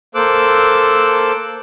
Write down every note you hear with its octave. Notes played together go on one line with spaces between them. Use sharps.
A#3 A4 C5 D6 E6 F#6